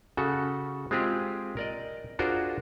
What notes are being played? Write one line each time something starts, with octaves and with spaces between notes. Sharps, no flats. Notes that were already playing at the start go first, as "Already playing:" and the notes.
C#3 F#4 A4
G#3 C4 F4 G4 G#4
A#4 D5 D#5
D4 F4 F#4 G#4 A#4 C5